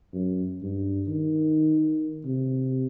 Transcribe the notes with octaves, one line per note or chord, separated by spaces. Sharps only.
F#2
G2
D#3
C3